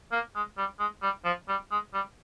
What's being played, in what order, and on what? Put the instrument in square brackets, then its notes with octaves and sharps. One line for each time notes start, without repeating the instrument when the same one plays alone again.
[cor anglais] A#3
G#3
G3
G#3
G3
F3
G3
G#3
G3